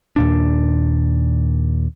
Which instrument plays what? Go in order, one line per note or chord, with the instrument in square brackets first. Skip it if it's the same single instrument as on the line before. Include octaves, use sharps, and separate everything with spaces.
[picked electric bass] D#2 A#2 D4